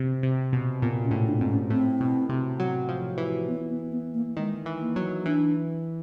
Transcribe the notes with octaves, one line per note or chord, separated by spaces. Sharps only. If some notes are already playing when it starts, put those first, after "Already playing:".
Already playing: C3
C3
B2
A#2 B3
C#4
A2
D4
G#2 C4
C#4
A2 C4
B2
C3
F#3
F3
E3
B3
B3
B3
A#3
D#3 G#3
E3
A#3
F#3
E3 D4